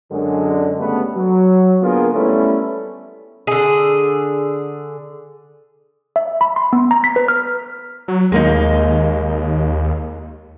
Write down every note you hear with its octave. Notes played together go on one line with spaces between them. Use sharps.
F#2 D3 G#3
C#3 G3 A3 B3
F#3
D3 A#3 B3 F4 G#4 A#4
G3 A3 B3 C#4 E4 A4
D3 G#4
E5
B5
C6
B3
A#5
B6
B4
F6
F#3
D#2 G#3 A#3 D#4